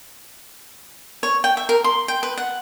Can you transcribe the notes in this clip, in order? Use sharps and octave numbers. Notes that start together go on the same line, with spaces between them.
C#5
G5
E5
A#4
C6
G5
B4
F#5